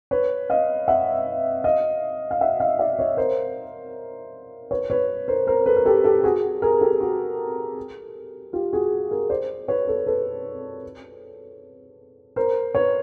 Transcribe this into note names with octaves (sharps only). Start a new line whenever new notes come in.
B4 C#5
D#5 F5
E5 F#5
D#5 F5
F5
E5 F#5
D#5 F5
D5 E5
C#5 D#5
A#4 C5
B4 C#5
B4 C#5
A#4 C5
A#4 C5
A4 B4
A#4
G4 A4
G4 A4
F#4 G#4
G#4 A#4
G4 A4
F#4
F4 G4
F#4 G#4
G#4 A#4
C5 D5
B4 C#5
A4 B4
A4 B4
A#4 C5
B4 C#5